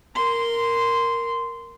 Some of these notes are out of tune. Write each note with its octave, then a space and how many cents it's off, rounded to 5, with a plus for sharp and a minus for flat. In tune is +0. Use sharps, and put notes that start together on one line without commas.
A#4 +0 C6 -10